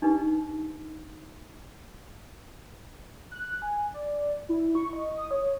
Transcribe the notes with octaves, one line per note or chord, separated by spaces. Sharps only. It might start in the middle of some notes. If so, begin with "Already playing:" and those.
D4 D#4 G4 B4
F#6
G#5
D5
E4
C#6
D#5
D#6
C#5